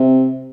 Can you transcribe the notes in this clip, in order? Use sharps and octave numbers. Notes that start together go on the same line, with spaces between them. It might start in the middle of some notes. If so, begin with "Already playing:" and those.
Already playing: C3